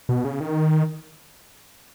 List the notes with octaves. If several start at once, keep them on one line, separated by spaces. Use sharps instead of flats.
B2
C#3
D#3